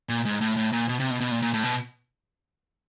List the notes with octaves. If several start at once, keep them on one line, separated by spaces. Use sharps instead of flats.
A#2
G#2
A2
A2
A#2
B2
C3
B2
B2
A#2
A#2
A2
B2